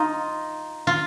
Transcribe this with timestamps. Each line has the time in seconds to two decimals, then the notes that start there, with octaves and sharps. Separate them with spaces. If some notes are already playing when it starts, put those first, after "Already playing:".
Already playing: D#4 F4
0.87 F4